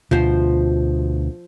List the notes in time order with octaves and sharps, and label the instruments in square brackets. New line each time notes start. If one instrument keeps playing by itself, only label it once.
[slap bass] D2 B2 [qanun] F3 C5